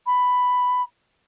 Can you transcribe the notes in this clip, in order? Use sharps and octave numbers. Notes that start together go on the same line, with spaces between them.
B5